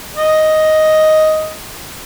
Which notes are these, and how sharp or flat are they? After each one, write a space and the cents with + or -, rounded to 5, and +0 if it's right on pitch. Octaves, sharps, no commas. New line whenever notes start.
D#5 +5